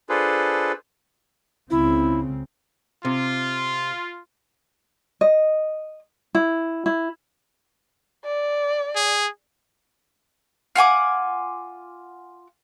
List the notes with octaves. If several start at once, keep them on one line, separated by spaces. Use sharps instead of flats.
D4 F4 G#4 A4 B4 C5
C#2 C#3 C4 E4
C3 F4
D#5
E4
E4
D5
G#4
F4 F#5 G#5 D6